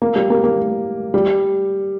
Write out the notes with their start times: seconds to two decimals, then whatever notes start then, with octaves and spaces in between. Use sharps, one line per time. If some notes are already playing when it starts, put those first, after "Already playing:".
0.02 A#3
0.16 G3
0.30 A#3
0.44 A#3
1.14 G3